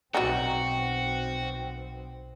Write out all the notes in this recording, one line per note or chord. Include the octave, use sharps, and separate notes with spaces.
B1 F#3 B3 C4 D#4 F#4 F#5 G5